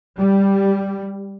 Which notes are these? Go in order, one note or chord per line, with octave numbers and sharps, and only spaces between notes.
G3